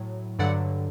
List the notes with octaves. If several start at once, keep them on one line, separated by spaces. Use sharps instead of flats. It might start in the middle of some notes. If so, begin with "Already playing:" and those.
Already playing: A2 F#3
G2 D3 F#3 D5 F#5